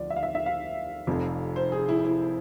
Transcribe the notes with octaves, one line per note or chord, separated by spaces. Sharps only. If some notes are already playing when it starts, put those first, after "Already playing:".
Already playing: D2 F3 D5
E5
F5
E5
E5
F5
F1 F2 C3
C5
G#4
E4
E4